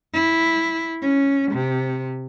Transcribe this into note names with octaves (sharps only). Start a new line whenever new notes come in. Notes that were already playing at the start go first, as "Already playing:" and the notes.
E4
C#4
C3